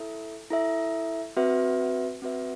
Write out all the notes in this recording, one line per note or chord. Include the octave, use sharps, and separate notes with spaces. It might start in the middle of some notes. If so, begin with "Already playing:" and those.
Already playing: E4 A4 E5
E4 A4 E5
C4 F#4 B4 E5
C4 F#4 B4 E5